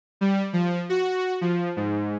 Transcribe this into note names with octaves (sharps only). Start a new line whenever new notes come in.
G3
F3
F#4
F3
G#2